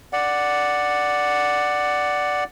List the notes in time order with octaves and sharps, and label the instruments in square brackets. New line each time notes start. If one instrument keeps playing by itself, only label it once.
[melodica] D5 F#5